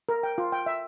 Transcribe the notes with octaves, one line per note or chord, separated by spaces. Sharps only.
A#4
G5
F4
G5
E5